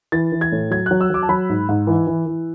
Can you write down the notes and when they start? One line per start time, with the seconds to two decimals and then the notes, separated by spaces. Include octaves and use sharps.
0.12 E3 A6
0.32 E3
0.41 G#6
0.52 A2
0.71 F#3 G#6
0.86 F#6
0.91 F#3
1.01 E6
1.10 F#3 D6
1.23 A5
1.29 F#3 B5
1.49 G#2
1.69 G#2
1.87 E3
2.07 E3
2.26 E3